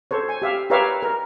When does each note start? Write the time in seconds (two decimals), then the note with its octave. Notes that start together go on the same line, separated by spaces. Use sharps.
0.11 A4 C5 C#5
0.29 G#5
0.42 G4 E5 F5
0.70 G4 A#4 B4 C#5 E5 F5
1.02 A#4